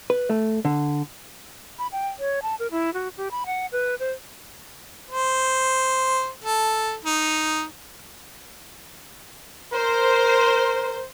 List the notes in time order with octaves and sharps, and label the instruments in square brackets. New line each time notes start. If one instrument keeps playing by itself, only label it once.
[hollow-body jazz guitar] B4
A3
D3
[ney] B5
G5
C#5
A5
A#4
E4
F#4
G4
B5
F#5
B4
C5
[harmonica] C5
A4
D#4
[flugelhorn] A#4 [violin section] C5